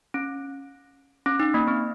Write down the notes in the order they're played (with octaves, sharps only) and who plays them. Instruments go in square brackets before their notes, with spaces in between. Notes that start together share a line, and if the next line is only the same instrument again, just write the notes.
[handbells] C#4
C#4
D#4
A#3
C4